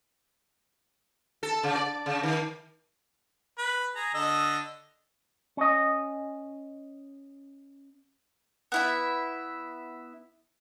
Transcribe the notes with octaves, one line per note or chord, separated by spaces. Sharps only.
A4
C#3
D5
C#3
D#3
B4
G#4 A#5
D3 D#5 E6
C#4 D#5
B3 E4 E5